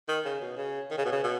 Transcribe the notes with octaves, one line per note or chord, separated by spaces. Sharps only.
D#3
C#3
B2
C#3
D#3
C#3
B2
C#3
B2